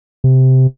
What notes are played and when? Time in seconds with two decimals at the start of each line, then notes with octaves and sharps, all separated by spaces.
0.24 C3